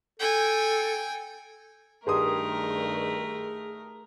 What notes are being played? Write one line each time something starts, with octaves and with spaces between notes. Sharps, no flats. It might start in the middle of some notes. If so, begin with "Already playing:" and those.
A4 G5 G#5
G2 D#3 A3 G4 G#4 A#4 C6 D#6